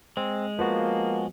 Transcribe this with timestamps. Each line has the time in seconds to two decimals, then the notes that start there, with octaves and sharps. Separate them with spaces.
0.17 G#3 C4
0.59 F3 A#3 B3 F#4